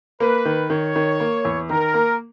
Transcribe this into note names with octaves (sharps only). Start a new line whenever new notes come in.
A#3 B4
D#3
D#3 C#5
D#3
A#3
E2
D#3 A#4
A#3